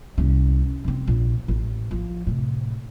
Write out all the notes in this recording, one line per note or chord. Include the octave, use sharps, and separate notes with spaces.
C2 C#4
F1 C4
A#1
A1
F3
A2 C3